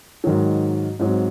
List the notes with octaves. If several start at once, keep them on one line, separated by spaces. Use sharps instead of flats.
G#2 D#3 F#3
G#2 F#3 C4